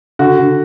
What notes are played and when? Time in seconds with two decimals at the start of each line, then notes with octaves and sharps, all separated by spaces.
0.19 D3 F#4
0.39 D3